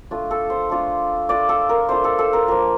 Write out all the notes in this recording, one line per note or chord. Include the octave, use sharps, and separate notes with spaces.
A3 D4 F4
A4
C5
A3 D4 F4
A3 D4 F4 D5
A4
A#4
A3 D4 F4 C5
A4
A4
A#4
F3 A#3 D4 F4 A#4